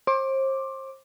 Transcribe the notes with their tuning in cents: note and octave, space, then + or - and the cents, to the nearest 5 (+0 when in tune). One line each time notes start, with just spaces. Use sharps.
C5 +35 D6 +0